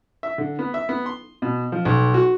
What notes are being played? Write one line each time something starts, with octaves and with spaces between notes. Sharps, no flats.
E5
D3
B3
E5
B3
C6
B2
F3
B1
F#4